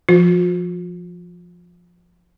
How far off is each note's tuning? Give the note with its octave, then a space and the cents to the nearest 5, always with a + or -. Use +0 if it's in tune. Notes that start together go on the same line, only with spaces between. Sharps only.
F3 +0 F4 +45